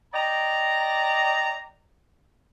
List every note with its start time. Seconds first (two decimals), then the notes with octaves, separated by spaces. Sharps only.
0.14 D5 D#5 G5 A#5